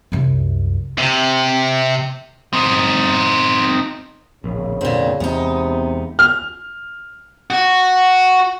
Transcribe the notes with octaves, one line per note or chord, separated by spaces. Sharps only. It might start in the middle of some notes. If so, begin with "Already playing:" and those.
C2 F#2
C3
C4 D#4
D1 A#1 C#3
F1 A#2 D3 C4
E2 C3 G#3 B3 D#4
F6
F#4